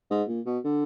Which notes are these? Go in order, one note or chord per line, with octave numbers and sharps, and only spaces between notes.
G#2
A#2
B2
D3